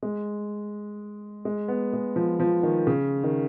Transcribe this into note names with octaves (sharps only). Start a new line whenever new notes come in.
G#3
G#3
B3
G#3
F3
F3
D#3
C#3
D#3